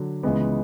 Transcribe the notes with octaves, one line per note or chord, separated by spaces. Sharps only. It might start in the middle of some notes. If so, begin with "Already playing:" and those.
Already playing: D3 F#3
C#2 C#3 E3 G#3 B3